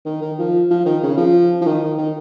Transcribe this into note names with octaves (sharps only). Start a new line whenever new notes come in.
D#3
D#3
F3
F3
D#3
C#3
F3
F3
D#3
D#3